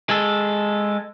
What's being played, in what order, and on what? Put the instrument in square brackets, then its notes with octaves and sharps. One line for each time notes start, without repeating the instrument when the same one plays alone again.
[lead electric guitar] G#3 A4